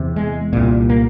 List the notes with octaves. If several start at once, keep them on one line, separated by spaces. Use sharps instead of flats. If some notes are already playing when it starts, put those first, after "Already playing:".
Already playing: E2 C3
G#3
C2 A#2
A#3